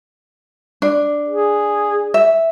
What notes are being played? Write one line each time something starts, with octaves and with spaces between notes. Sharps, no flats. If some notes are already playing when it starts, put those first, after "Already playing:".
D4
G#4
E5